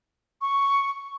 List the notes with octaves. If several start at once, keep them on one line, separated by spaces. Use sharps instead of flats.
C#6